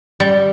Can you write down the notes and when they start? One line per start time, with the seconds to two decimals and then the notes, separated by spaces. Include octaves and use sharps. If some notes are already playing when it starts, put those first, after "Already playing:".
0.20 G3